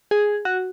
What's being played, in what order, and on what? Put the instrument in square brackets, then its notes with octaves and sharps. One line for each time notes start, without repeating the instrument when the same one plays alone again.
[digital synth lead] G#4
F#4